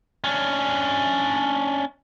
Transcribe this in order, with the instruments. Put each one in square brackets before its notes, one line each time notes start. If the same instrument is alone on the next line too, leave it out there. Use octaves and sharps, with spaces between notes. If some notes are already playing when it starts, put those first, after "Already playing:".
[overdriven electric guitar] C#4 D4